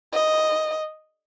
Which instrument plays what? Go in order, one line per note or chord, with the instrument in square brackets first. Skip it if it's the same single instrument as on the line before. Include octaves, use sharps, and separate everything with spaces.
[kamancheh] D#5